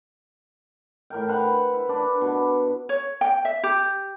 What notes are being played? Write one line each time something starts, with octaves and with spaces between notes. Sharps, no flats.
A2 A#4 G5
B4 C5 F#5 A#5
E4
D4 B4
B2
C#5
G5
E5
G4